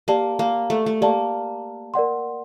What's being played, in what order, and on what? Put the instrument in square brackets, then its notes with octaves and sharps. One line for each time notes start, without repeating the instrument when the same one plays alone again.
[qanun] A#3 [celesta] G4 D5 A5
[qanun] A#3
A3
A3
[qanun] A#3 [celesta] G4 D5 A5
[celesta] A#4 D5 F#5 C6